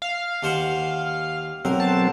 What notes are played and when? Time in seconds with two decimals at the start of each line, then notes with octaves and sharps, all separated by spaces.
0.02 F5
0.43 D#2 C5 F#5
1.65 B1 F#3 C4 A#4
1.80 A5